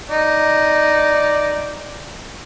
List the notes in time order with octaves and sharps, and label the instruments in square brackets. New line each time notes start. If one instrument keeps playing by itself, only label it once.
[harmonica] D#4 D5